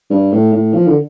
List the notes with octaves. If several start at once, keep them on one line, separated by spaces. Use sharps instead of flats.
G2
A2
A2
F3
D3